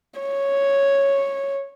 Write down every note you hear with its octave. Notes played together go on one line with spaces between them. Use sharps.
C#5